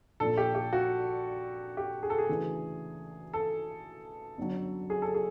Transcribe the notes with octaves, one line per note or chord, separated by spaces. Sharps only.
A#1 A#2 F3 A4
G4
G4
F#4
G4
G#4
A4
G#4
D2 C#3 E3
A4
G1 F#2 D3 F#3
G#4
A4
G#4